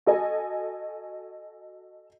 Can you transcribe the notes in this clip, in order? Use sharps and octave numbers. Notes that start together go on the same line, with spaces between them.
F#4 A4 D#5 G#5